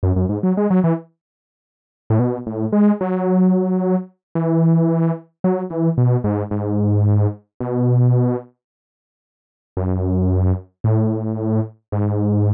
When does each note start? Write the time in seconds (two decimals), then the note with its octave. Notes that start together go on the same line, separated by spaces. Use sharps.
0.03 F#2
0.16 F#2
0.29 G#2
0.43 F#3
0.57 G#3
0.70 F#3
0.84 E3
2.10 A2
2.19 B2
2.47 A2
2.73 G#3
3.01 F#3
4.35 E3
5.44 F#3
5.70 E3
5.98 B2
6.24 G#2
6.51 G#2
7.60 B2
9.77 F#2
10.84 A2
11.92 G#2